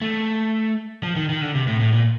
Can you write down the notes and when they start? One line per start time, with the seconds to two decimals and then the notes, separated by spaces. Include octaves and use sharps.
0.01 A3
1.03 F3
1.16 D#3
1.29 D#3
1.42 D3
1.55 C3
1.67 A2
1.80 A2
1.93 A#2